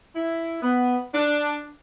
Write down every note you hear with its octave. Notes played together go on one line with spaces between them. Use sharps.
E4
B3
D4